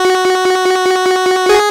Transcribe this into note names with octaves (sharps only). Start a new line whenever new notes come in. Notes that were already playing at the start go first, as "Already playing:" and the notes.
Already playing: F#4
G#4